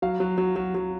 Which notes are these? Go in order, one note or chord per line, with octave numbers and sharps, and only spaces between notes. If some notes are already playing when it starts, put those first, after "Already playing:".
F#3 F5
F#3
F#3
F#3
F#3